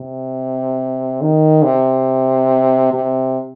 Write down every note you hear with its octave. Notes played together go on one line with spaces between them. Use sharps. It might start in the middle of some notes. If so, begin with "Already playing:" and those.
Already playing: C3
D#3
C3
C3